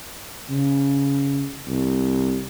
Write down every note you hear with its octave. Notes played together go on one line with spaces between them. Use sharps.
C#3
C2